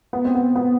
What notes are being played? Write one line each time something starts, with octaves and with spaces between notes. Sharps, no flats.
B3
C4
B3
B3